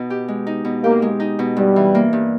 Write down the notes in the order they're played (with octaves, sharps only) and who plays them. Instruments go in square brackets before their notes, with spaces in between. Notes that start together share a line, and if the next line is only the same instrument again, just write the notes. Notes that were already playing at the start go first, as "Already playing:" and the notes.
Already playing: [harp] B2 D#4
G4
G#3
D#4
B2
[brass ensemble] A#3 [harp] G4
[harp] G#3
D#4
B2
[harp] G2 [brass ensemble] G3
[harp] E3
A#3
G2